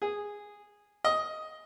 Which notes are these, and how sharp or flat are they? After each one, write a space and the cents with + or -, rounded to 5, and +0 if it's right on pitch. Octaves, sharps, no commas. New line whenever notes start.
G#4 -10
D#5 +10